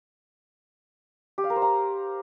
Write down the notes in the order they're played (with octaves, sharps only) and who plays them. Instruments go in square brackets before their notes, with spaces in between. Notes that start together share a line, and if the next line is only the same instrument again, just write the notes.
[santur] G4
F5
A#4
C5
A#5